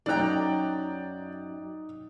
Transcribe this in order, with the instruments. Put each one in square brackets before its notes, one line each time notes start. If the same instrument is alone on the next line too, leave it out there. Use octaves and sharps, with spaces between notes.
[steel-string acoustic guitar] F#2 A#5 [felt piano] D#4 F#6 [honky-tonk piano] D5 G5